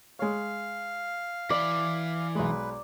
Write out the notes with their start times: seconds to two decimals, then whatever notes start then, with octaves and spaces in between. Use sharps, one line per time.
0.19 G#3 C#5 F5
1.50 E3 D5 B5
2.35 B1 G#3 B4